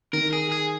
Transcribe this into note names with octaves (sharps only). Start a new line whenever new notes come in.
D#3 A#4
G#4
G#4